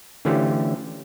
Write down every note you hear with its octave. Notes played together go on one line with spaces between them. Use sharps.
D3 E3 A3 C#4 F4 G4